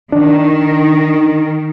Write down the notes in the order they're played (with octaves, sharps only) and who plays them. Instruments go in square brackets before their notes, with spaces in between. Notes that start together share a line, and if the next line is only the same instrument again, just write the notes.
[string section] D#3 [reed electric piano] D4